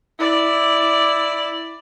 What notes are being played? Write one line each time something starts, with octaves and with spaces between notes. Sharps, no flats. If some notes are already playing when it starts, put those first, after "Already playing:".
E4 D5